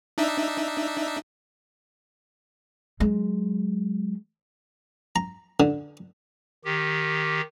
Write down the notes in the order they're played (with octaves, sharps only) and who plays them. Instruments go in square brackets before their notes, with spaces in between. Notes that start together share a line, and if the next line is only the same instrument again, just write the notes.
[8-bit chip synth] D4 D#4 E5
[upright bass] F#3 G#3
[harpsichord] A#5
D3
[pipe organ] D#3 G4